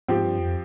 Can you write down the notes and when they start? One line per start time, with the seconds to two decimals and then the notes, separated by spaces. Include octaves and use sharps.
0.08 G#2 F3 C4 G4
0.24 G2
0.39 F2